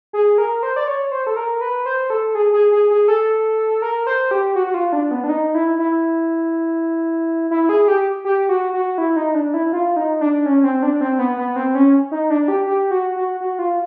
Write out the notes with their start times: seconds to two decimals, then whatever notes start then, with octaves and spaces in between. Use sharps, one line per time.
0.13 G#4
0.38 A#4
0.63 C5
0.76 D5
0.88 C#5
1.11 C5
1.27 A4
1.36 A#4
1.61 B4
1.86 C5
2.10 A4
2.35 G#4
2.53 G#4
2.72 G#4
2.91 G#4
3.08 A4
3.82 A#4
4.07 C5
4.31 G4
4.56 F#4
4.67 F#4
4.74 F4
4.93 D4
5.11 B3
5.24 D4
5.29 D#4
5.54 E4
5.79 E4
7.51 E4
7.69 G#4
7.88 G4
8.25 G4
8.49 F#4
8.73 F#4
8.98 E4
9.16 D#4
9.35 D4
9.54 E4
9.72 F4
9.96 D#4
10.21 D4
10.46 C#4
10.64 C4
10.83 D4
11.01 C4
11.19 B3
11.38 B3
11.56 C4
11.75 C#4
12.11 D#4
12.30 D4
12.48 G4
12.67 G4
12.91 F#4
13.16 F#4
13.41 F#4
13.59 F4